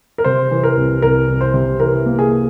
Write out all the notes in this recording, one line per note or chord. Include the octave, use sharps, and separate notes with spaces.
A#4
C3 C5
E3
A#4
C2
C2 A#4
C2
C5
C3
E3 A#4
A#3
G#4